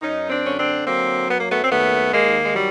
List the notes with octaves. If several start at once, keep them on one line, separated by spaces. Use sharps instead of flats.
F#2 C#4 D#4
C4 D4
D3 C#4
C4 D4
F#3 A#3 C4
F#2 B3
A#3
A3 B3
C4
D#2 A3 B3
D#3 G#3 A#3
G#3
F#3 G3